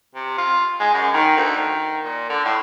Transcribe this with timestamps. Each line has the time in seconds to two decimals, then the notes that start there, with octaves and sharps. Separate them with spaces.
0.15 C3
0.38 F4
0.80 G#3
0.94 F#2
1.14 D#3
1.37 D2
1.57 D#3
2.04 A#2
2.29 D3
2.45 A2